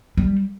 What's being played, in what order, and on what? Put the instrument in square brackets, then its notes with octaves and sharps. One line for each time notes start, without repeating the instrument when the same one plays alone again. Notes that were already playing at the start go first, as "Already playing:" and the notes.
[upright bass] G3